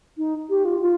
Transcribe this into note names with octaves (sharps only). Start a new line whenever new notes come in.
D#4
G4
F4
F4